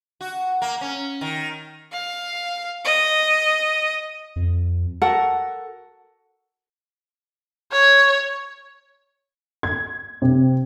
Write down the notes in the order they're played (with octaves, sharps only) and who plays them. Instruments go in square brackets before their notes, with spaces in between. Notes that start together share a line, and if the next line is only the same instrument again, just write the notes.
[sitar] F#4
A#3
C#4
D#3
[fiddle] F5
D#5
[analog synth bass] F2
[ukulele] F#4 A4 A#4 F#5
[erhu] C#5
[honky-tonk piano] G#6
C3